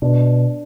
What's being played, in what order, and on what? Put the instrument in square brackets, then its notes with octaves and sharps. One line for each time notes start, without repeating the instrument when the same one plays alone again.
[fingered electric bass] B2 [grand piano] D4